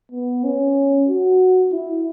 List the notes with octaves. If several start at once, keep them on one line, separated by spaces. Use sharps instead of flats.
B3
C#4
F#4
E4